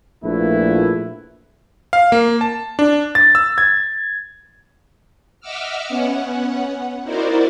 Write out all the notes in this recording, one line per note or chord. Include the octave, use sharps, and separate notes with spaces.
A#1 A#2 A3 E4 B4
F5
A#3
A5
D4
A6
E6
G#6
D#5 E5 F#5 D6 E6 F6
B3 C#4 F#5
D#4 E4 F#4 A#4 C5 D5